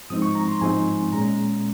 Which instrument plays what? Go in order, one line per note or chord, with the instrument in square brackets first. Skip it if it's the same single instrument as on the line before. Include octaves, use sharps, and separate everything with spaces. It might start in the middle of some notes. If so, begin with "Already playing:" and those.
[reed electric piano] G#2 F3 G#3 C4 D#4 D#6
C#6
A#5
C6
G#2 F3 G#3 C4 D#4 G#5
A#2 G#3 C#4 A#5